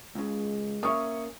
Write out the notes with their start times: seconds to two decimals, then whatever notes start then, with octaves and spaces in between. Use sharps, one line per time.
0.15 C#2 C#3 G#3
0.83 A#3 C#4 E5 C#6 D#6